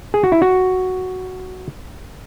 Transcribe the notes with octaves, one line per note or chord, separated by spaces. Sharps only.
G#4
F#4
E4
F#4